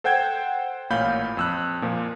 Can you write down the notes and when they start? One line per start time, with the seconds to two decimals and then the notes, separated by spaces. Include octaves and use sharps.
0.04 A4 C5 F#5 G5 G6 G#6
0.90 A1 A#2 C#5 F5 B5 G6
1.37 F2 E6 F#6
1.82 A#2 F3